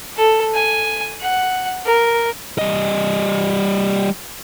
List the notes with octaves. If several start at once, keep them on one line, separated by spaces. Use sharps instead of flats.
A4
G#5
F#5
A#4
G3 D#5